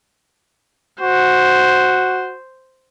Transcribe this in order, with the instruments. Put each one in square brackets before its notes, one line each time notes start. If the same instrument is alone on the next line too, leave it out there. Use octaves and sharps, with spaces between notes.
[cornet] F#4 [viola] C5